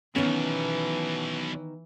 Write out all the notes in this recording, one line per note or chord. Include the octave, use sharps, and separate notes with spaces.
B1 B2 D#3 E3 B3 C#4